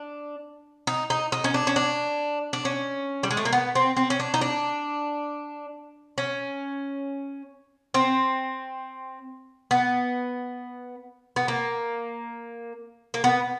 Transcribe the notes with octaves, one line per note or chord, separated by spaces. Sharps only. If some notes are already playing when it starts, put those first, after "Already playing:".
Already playing: D4
D#4
D#4
D#4
C#4
D4
C#4
D4
D4
C#4
G3
G#3
A3
A#3
B3
C4
C4
C#4
D4
D#4
D4
C#4
C4
B3
B3
A#3
A#3
B3